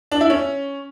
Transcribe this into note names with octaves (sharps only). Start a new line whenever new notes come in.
D4
E4
C#4